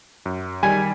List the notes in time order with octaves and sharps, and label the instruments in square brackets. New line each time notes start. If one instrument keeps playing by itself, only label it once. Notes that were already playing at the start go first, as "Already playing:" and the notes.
[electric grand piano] F#2
[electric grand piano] D#3 G3 [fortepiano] G#5